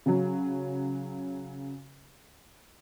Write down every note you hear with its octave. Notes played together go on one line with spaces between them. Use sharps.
C#3 F#3